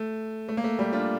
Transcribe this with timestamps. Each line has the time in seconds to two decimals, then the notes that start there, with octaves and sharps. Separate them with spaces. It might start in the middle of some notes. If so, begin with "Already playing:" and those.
Already playing: A3
0.49 A3
0.57 A#3
0.64 A3
0.79 G3
0.93 D4 F4